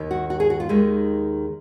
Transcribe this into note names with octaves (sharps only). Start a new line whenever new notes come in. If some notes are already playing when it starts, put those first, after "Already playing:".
Already playing: D#2 D#3
F#4
F#4
G#4
F#4
F4
D#2 D#3 G#3